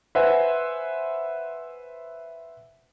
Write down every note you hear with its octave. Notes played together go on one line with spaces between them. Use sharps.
B4 C5 E5 F#5 G#5